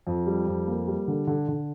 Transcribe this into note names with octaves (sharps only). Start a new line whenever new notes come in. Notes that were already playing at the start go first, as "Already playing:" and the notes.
F2
G3
F2
A#3
G3
D3
D3
D3